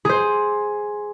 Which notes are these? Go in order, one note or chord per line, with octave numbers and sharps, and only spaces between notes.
G#4 C5